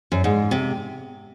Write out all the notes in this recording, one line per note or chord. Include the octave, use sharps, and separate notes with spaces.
F#2
G#2
C3